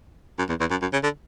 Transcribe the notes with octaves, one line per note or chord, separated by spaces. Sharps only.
F#2
E2
E2
F#2
F#2
C#3
D3